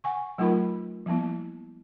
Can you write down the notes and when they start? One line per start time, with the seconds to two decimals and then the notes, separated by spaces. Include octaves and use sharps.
0.04 F#5 G#5 C#6
0.38 F#3 A3 D#4 F4 A#4 B5
1.06 F3 G3 A#3 B3 E4